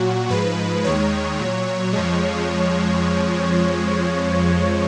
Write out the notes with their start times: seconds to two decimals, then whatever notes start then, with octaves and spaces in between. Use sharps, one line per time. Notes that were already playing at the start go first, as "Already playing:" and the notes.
Already playing: A#2 F#3 F#4
0.30 G#2 F3 G#3 B4
0.84 D#2 D#3 G#3 C#5
1.39 A#2 F#3
1.93 F2 F3 G#3